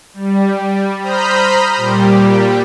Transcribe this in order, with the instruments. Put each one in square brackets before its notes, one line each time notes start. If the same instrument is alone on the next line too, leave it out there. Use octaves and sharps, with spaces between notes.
[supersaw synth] G3
C5 A#5 B5 D#6 F6 G6
A#2 G3 G4